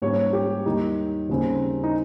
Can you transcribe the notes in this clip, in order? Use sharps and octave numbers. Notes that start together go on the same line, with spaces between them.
G#2 G3 A#3 C#4 C#5
G4
D#2 D#3 G3 D#4
D#2 C#3 G3 C4
D#4